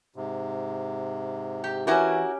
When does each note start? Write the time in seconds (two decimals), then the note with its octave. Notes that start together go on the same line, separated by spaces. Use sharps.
0.16 G#2 C3
1.64 G4
1.87 E3 C#4 E4 F#4 G4 A#4